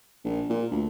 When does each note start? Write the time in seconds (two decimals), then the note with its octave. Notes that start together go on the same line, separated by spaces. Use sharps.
0.24 A#1
0.50 A#2
0.71 D2